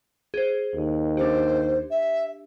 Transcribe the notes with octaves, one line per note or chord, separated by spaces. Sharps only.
G#4 C5
D#2
D4 G4 C5
E5